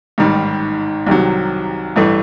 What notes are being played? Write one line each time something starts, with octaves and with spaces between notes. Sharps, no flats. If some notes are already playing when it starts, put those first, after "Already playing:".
A1 G#2 D#3 G3
C2 C3 D#3 F#3
A1 G2 E3 A3